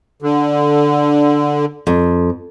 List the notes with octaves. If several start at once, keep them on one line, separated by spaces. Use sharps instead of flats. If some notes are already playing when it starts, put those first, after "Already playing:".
D3
F2